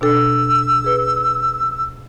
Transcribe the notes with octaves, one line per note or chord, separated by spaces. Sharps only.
B2 D4 A4 E6
G#4 B4